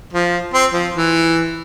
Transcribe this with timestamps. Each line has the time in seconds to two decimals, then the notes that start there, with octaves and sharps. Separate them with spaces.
0.13 F3
0.54 C4
0.73 F3
0.96 E3